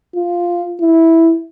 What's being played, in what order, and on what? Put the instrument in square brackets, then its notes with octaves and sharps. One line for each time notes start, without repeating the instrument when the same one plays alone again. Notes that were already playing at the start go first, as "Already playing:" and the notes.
[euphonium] F4
E4